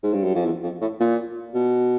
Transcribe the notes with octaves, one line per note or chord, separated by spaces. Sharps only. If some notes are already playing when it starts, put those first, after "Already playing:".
G#2
G2
F#2
F2
E2
F2
A2
A#2
B2